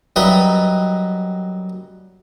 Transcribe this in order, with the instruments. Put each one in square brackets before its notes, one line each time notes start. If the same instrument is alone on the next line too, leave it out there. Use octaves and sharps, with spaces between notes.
[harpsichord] F#2 G3 D#4 B4 D#5 E5